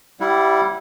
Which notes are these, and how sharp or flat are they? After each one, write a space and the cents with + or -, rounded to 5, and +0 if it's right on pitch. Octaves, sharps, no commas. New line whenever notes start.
G3 -10 E4 +0 F#5 -40